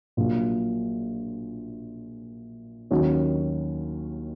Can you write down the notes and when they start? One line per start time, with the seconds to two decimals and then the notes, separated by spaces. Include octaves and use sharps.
0.17 A#1 A#2 F#3 A#3 F4
2.91 D#2 D#3 F#3 C#4 F#4